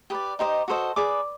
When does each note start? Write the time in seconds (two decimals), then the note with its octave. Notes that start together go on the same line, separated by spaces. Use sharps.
0.10 G4 B4 D5 D#6
0.39 D#4 G4 C5 D#5
0.68 F#4 A4 C5 D#5
0.96 G#4 B4 D5 D6